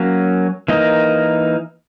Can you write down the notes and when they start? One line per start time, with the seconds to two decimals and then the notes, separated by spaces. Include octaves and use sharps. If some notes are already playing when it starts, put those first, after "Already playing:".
Already playing: F#3 A#3 C#4
0.68 E3 A#3 D#4 A#4 D#5